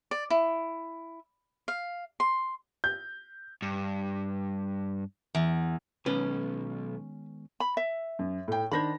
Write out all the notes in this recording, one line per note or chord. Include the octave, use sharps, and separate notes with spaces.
D5
E4
F5
C6
G6
G2
E2
B1 D#3 G#3 B3 C#4 B4
B5
E5
F#2
A2 G5
D#3 D4 C5 B5 A#6